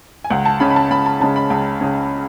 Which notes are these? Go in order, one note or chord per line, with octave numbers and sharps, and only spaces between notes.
G#5
C#2 F#5
A5
C#3 G#3 C#4 B5
B5
A5
C#2 B5
A5
C#3 G#3 C#4 A5
B5
C#2
C#3 G#3 C#4